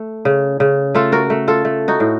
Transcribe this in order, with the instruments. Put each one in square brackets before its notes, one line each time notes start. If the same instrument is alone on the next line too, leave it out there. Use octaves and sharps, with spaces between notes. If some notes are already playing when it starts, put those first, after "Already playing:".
Already playing: [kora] A3
C#3
C#3
A3 F4 A4
F#4 A#4
A3
F4 A4
A3
D#4 F#4
A2